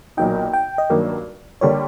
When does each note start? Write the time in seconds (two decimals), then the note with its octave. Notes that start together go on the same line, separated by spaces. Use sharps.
0.17 B1 A#2 F#3 A#3 D#4 G5
0.54 G5
0.78 D#5
0.90 G2 D#3 F#3 A#3 D4
1.61 D3 G3 A#3 C#5